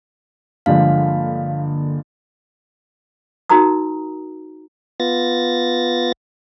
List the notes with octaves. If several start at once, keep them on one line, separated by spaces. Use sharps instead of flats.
G2 D3 F3 G#3 A#3 F5
D#4 F#4 A#4 A#5 D#6
B3 F4 A6 A#6